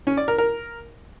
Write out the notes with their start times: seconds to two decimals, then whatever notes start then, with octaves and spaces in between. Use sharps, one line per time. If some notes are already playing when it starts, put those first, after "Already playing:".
0.07 C#4
0.17 D5
0.28 A#4
0.38 A#4